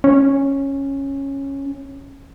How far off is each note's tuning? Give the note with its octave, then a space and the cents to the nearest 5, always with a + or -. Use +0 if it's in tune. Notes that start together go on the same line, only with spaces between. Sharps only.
C#4 -10